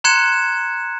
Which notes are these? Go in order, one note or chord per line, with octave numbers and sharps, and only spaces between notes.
A#5 C6 F#6 G#6 C#7 E7